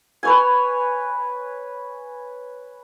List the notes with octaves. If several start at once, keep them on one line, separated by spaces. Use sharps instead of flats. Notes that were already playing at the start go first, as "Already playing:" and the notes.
B4 C#5 G#5